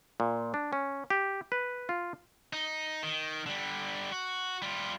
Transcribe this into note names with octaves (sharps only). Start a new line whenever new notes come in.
A#2
D4
C#4
G4
B4
F4
D#4
D#3
D3 G3
F#4
G3 F4